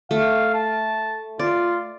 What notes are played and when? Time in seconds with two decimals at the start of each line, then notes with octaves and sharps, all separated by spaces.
0.11 A3 F5
0.54 A5
1.39 F4 D5